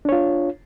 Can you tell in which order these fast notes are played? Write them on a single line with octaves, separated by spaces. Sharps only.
D4 C#5 F4